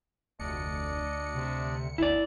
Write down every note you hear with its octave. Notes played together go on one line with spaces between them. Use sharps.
F1 D2 D4 D5 D#5 C#7
C3
G1 D2 E4 D5